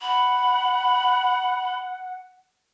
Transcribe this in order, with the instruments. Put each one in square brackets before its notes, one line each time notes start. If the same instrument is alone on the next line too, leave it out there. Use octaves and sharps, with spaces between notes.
[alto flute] F#5 [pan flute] B5